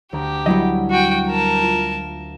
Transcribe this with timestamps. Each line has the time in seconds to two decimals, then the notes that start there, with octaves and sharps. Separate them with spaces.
0.13 D2 G4 A#5
0.46 F#3 G3 E4 D#5
0.90 F#4 G5
1.28 A#4 A5
1.63 F4